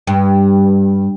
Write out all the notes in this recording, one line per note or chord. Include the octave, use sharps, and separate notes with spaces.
G2